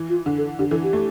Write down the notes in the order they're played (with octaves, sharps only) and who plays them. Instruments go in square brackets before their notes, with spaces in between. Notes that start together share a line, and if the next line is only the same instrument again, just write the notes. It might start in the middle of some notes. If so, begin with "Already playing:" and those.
Already playing: [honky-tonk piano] E3
[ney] F4
[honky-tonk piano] D3
[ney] A4
[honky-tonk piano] D3 [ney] G4
[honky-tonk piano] E3 [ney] A4
[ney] G4
[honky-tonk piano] A3